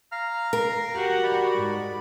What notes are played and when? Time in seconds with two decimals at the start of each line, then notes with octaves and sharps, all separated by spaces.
0.12 F5 A#5 F6
0.53 A#4
0.93 F#4 G4
1.23 D5 B5
1.56 G#2